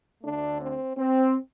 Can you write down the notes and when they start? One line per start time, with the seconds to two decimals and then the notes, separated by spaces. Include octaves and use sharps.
0.23 D2 D3 A3 D4
0.60 C4
0.98 C4